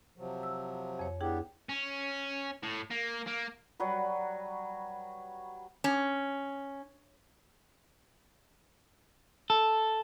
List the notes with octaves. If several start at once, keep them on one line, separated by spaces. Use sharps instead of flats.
C3 F3 F#3
E6
F2 C#5
B3 D4 E4 G4 G#4 G5
C#4
A2
A#3
A#3
F#3 G3 F#4 B4
C#4
A4